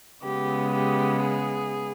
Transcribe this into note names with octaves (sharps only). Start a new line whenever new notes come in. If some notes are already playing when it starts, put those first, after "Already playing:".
C#3 G#3 B3 G4
G4
G#4